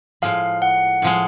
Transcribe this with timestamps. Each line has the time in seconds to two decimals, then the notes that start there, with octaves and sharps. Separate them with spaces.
0.22 A2 F3 G#3 F5
0.62 F#5
1.02 A2 F3 G#3